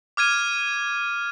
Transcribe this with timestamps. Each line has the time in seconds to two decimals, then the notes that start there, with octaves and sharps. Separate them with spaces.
0.17 D6 F6 G#6 D#7